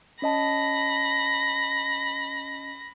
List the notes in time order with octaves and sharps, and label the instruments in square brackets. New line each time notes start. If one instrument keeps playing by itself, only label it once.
[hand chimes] C#4 D#5 A5 [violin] B5 A#6